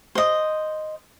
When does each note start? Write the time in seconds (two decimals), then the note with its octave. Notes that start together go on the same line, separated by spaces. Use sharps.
0.15 C5 D#5